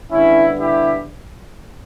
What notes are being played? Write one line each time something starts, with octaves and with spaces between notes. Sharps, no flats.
D3 G3 B3 C#4 E4
E4 G4